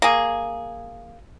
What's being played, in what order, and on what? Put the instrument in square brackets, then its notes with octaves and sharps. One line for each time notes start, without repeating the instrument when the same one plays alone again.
[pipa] A#3 G#4